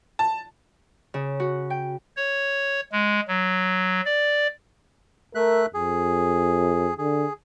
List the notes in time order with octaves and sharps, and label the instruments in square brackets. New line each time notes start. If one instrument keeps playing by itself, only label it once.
[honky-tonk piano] A5
[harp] C#3
F#4
G5
[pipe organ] C#5
G#3
F#3
D5
[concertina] A3 E5 F#6 [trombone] A#4
[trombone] F2 [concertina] G#4
[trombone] D3 [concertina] G#4